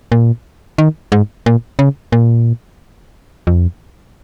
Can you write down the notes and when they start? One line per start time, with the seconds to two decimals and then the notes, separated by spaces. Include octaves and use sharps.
0.12 A#2
0.78 D#3
1.12 G#2
1.46 A#2
1.79 C#3
2.12 A#2
3.47 F2